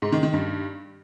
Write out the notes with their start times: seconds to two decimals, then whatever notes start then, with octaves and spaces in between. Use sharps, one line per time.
0.02 G#2
0.12 D#3
0.23 D#3
0.33 G2